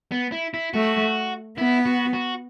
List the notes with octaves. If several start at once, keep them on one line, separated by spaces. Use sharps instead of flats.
B3
E4
E4
A3 F#4
B3 E4
F#4
F#4